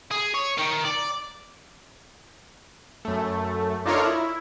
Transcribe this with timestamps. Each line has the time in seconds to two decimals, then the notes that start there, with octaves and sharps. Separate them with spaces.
0.11 G#4
0.34 C#5
0.58 D#3
0.85 D5
3.05 F#2 A3
3.86 D4 D#4 F4 A4 A#4 C#5
4.04 E4